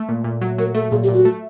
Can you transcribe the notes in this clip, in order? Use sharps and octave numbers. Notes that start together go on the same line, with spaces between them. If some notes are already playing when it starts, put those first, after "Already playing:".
Already playing: A3
A#2
A#2
F#3
F#3 A#4
A3 A4
A#2 G#4
G4
A#2
F#4
A3